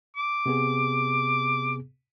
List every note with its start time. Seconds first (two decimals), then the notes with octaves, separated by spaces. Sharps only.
0.16 D6
0.46 C3 B3 G#4